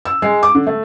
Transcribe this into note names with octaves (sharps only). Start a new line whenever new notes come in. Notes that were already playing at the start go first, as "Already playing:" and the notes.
E6
G#3
D6
D3
A3